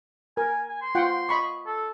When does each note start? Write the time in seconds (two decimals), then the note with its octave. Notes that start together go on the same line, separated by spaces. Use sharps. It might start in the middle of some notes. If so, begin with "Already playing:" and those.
0.37 A#4 G#5
0.69 G#5
0.82 C6
0.95 F4 F#5 G5
1.29 D#5 B5 C#6
1.67 A4